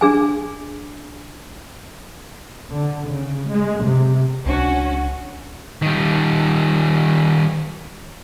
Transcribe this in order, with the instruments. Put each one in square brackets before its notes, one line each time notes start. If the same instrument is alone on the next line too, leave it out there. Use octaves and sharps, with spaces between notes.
[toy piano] D4 G#4 G#5
[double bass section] D3
C#3
G#3
C3
[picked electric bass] C#2 D4 [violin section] C#4 F#4
[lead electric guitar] D#3 G3